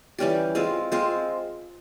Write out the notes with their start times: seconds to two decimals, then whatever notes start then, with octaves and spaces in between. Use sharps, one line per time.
0.18 E3 G3 C#4 G4
0.55 G#3 C4 F4
0.92 G#3 C4 F4